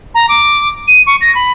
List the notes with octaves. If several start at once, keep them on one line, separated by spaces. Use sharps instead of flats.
A#5
D6
D#7
C#6
A#6
B5